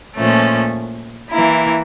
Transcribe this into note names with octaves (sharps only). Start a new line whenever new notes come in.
A#2 F3 A3 C#4
E3 A#3 E4